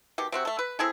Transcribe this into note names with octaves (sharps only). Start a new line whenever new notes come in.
B2 D#3 G4
C3 C4 F#4
A3 A4
B4
C4 E4 G#4 A4